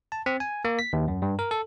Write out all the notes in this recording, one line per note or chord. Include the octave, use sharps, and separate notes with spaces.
A5
C4
G#5
A#3
B6
D#2
F#2
G2
A#4
A4